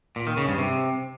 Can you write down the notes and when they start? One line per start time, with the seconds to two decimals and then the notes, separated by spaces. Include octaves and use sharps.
0.16 A#2
0.27 D#3
0.37 C#3
0.48 G2
0.58 C3